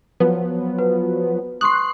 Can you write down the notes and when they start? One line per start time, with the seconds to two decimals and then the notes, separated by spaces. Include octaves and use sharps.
0.20 F3 F#3 B3
0.79 B4
1.61 C6 C#6 D#6 F#6 C7